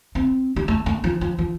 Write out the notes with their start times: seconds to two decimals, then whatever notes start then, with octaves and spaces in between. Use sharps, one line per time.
0.15 C4
0.56 G3
0.68 A3
0.86 A3
1.04 F3
1.21 F3
1.38 F3